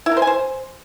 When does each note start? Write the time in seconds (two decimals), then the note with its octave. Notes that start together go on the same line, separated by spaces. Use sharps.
0.06 E4
0.11 A#4
0.17 C5
0.22 G#5
0.27 C5